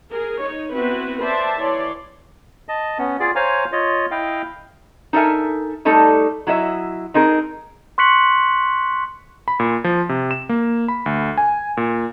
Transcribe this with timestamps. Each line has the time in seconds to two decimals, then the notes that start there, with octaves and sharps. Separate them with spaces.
0.12 G#4 A#4
0.42 D#4 C#5
0.74 B3 C4 E4 F#4 B4
1.21 B4 C5 D5 E5 A5
1.60 E3 C#5 D5 C6
2.69 D#5 A5
2.99 B3 C#4
3.20 F4 G#4 D5
3.36 C5 C#5 F5 G#5 A#5
3.72 F4 C#5 D#5
4.11 E4 D#5 F5 G5
5.13 D#4 A4 A#4 E5 G#5
5.85 G3 A3 D#4 A4
6.47 F#3 E4 D#5 E5
7.14 C4 D#4 G#4 A#4
7.98 C6 C#6 F#6 B6 C#7 F#7
9.48 B5
9.60 A#2
9.84 F3
10.09 C3
10.31 E7
10.49 A#3
10.88 B5
11.06 D2
11.38 G#5
11.77 A#2